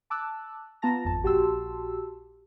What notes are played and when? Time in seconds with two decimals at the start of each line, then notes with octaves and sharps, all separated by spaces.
0.10 A5 D6 E6 F#6
0.82 B3 F4 A5 A#5 A#6
1.05 G#1 F2 A5
1.23 A#1 F#4 G4 A5 C6 E6